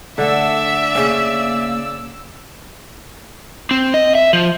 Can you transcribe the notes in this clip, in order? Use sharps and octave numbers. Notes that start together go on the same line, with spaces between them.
D3 A3 D5 E5 F#5 E6
C#3 A#3 C#4
C4
D#5
E5
F3